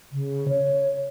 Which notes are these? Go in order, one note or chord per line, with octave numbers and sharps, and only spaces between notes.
C#3
C#5